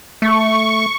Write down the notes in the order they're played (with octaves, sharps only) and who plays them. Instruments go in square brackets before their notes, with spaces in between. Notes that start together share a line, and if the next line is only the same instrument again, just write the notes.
[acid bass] A3 [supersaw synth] C#6